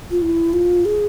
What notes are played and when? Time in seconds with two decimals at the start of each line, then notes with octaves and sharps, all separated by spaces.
0.11 F4
0.22 E4
0.53 F4
0.85 G#4